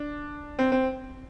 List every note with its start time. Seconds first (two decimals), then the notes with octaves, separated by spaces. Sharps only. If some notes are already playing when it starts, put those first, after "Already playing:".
Already playing: D4
0.59 C4
0.72 C4